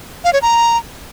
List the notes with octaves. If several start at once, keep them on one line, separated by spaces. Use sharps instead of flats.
F5
C#5
A#5